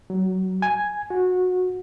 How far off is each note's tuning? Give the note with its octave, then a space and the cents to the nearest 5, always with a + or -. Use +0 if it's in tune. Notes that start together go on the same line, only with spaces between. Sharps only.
F#3 +20
G#5 +0
F#4 -20